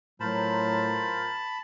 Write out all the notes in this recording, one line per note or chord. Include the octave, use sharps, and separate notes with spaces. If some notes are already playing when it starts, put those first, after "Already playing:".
A2 F#3 F4 A#4 C5 A5 B5